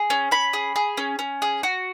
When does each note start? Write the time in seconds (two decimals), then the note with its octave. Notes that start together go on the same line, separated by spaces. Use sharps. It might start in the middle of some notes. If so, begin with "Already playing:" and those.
Already playing: G#4
0.10 C#4
0.31 C#4 B5
0.53 G#4
0.76 G#4
0.97 C#4
1.19 C#4
1.42 G#4
1.63 F#4